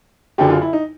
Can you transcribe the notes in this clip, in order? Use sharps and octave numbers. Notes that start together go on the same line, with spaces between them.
F#1 F#2 D3 F#3 G4
F4
E4
D#4